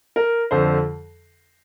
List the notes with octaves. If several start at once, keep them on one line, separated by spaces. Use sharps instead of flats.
A#4
F2 D3 C5